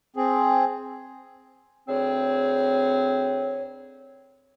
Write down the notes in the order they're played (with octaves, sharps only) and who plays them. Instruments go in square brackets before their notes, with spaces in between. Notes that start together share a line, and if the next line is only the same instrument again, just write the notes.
[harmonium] C4 G#4
[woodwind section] D2 C4 G#4 C#5